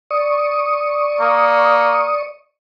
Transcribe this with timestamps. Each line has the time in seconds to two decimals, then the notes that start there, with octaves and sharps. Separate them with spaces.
0.11 D5 C#6 D#6
1.20 A#3